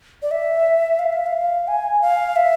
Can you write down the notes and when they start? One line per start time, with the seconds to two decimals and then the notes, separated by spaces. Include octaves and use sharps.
0.22 D5
0.31 E5
0.99 F5
1.13 E5
1.26 F5
1.68 G#5
2.02 F5
2.36 E5